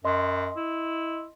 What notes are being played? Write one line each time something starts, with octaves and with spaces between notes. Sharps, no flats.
F#2 D#5 C6
E4